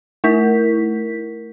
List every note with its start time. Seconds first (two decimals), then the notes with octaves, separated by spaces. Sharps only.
0.24 A3 E4 A#4 B6